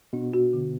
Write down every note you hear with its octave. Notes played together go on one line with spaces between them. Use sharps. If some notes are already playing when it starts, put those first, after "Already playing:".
B2 D4
F#4
D3